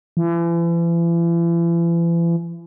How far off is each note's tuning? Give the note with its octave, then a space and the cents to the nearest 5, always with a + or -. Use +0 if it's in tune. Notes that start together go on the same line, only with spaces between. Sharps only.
E3 +40